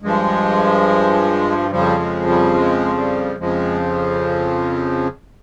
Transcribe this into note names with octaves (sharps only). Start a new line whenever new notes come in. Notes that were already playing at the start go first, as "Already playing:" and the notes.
G2 F3 G#3
F2 C#3 F3 G3
G#3
G3
G#3
G3
F2 C#3 F3 G#3